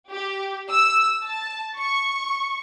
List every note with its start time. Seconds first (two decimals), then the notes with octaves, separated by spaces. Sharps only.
0.10 G4
0.71 E6
1.26 A5
1.79 C#6